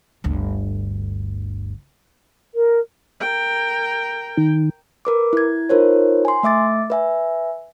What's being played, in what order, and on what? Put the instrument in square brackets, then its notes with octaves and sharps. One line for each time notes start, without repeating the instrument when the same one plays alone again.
[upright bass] G1 D2
[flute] A#4
[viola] A#4 G5
[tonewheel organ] D#3
[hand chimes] A#4 B4 D6
E4 G#6
D#4 F4 A#4 C5 C#5
G#5 C6
A3 E5 D6 A6
B4 E5 G#5